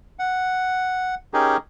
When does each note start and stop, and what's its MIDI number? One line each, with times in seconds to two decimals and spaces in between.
0.19 1.15 78
1.34 1.57 61
1.34 1.57 63
1.34 1.57 67
1.34 1.57 68
1.34 1.57 70